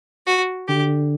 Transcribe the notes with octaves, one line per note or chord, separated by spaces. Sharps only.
F#4
D3 G4